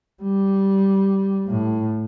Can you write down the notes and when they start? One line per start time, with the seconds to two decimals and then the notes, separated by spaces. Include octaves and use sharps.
0.23 G3
1.47 A2